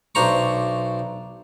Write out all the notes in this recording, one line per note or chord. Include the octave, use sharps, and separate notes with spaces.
B1 D4 C5 A#5 C#6